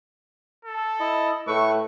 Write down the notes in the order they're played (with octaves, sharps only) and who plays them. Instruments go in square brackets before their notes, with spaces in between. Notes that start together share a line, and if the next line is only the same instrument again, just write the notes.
[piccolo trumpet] A4
[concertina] E4 D#5
[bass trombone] A2 [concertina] A3 B4 E5 [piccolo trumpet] C#6